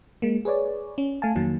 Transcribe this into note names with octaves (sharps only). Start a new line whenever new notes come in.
G#3 A#3
G#4 B4 C#5 D5
C#4
A3 F5 G#5 A5
F2 D#3 F#3 A#3